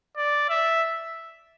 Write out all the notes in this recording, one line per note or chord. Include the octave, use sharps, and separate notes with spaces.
D5
E5